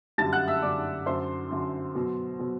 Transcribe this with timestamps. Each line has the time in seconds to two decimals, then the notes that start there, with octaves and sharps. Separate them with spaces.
0.18 F#2 D3 G3 A5 A6
0.33 F#5 F#6
0.48 E5 E6
0.62 F#2 D3 G3 D5 D6
1.06 F#2 D3 F#3 C5 C6
1.51 F#2 D3 F#3
1.95 B2 F#3
2.39 B2 F#3